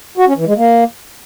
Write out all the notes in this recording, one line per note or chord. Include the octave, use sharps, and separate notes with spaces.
F#4
C#4
E3
G#3
A#3